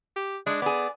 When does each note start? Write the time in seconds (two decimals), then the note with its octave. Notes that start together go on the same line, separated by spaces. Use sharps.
0.16 G4
0.47 G#3 D4
0.62 B3 G#4 D5